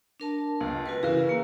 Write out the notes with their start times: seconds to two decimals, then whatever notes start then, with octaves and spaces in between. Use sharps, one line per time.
0.20 D4 A#4 A5
0.60 C#2
0.86 F#4 A#4 B4
1.03 C#3 E3 G#4 A#4 B4
1.29 A#3